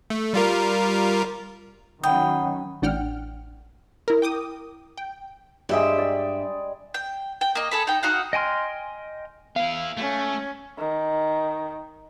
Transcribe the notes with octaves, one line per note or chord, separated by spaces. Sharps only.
A3
G3 F4 A#4
D#3 F#3 C#4 F#5 G5 B5 D#6
A1 D4 F#5 G5 F6
E4 A#4
G5 D6 D#6
G5
G2 G3 G#3 E5 G5
D5
G5
G5
A#3 D#5
G#4 A4 B5
D#4 G5
D#4 F#4 F5 F#5
D#5 G5 G#5 C6 F6
B3 E4 F5
A3 C#4
D#3